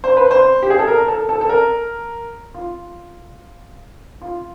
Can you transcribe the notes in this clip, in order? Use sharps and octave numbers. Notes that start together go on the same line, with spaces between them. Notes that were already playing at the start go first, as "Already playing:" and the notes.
C5
B4
C5
G4
G#4
A4
A#4
A4
A4
A4
A#4
F4
F4